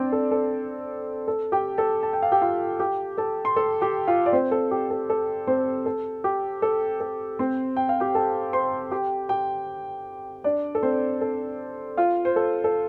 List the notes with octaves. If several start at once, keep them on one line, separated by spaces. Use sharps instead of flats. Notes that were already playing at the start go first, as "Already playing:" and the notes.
Already playing: C4 D4 C5 D5
A4
A4
A4
G4 G5
A4 A5
A5
G5
F5
G4 G5
F4 F5
G4 G5
A4 A5
C6
A4 A5
G4 G5
F4 F5
D5
C4 C5
A4
G4
A4
A4
C4 C5
A4
G4
A4
A4
C4 C5
G5
F5
G4 G5
A4 A5
C5 C6
G4 G5
G4 G5
D4 D5
A4
C4 C5
A4
F4 F5
C5
A4
A4